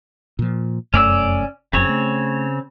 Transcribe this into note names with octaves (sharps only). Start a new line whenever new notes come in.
A#2 F3
F1 F#2 A3 C#4 D5 E6
F#1 F#2 C#3 C4 C#5
A3